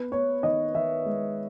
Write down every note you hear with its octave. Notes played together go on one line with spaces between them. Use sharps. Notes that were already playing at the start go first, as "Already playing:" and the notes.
Already playing: B3 B4
B3 C#5
D#3 D#5
D#3 E5
G#3